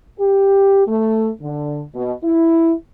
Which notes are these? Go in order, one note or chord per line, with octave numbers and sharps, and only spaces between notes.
G4
A3
D3
B2
E4